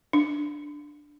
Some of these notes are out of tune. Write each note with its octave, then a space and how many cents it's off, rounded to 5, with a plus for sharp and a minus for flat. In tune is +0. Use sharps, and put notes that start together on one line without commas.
D4 +5